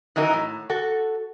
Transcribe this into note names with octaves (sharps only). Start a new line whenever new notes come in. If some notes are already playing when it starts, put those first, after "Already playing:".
D#3 E3 F#3 D#4 A#4
A2
F#4 A4